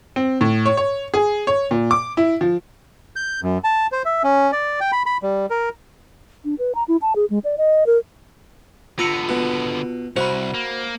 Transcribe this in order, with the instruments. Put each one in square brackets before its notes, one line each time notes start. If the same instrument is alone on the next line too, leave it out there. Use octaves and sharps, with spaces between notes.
[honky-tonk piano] C4
A2
C#5
C#5
G#4
C#5
A#2
D6
E4
F3
[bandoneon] G6
F#2
A5
C5
E5
C#4
D5
G5
B5
B5
G3
A#4
[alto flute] D4
B4
A#5
E4
A5
G#4
G#3
D5
D#5
A#4
[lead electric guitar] D3 B3 [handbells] F4 E6 C#7 [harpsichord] A#5
[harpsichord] B2
[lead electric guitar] C2 [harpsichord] F#4 [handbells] C5 B5
[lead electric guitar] A#3